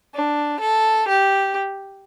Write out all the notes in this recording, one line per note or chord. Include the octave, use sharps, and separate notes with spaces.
D4
A4
G4